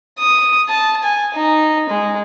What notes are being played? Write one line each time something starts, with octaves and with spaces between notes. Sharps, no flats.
D#6
A5
G#5
D#4
G#3